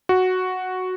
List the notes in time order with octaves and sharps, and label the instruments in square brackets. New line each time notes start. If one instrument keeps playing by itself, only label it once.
[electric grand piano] F#4